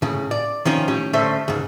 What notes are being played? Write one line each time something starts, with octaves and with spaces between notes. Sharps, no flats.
A2 C#3
D5
D#3 F3 C#4
A2 C#4 G4
D3 A3 C#4 C5 E5
C#2 G#2